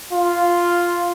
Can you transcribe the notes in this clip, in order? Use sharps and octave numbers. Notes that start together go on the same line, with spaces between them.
F4